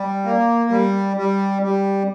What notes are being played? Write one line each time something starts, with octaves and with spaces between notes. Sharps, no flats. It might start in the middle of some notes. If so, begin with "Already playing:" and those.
Already playing: G3
A#3
G3
G3
G3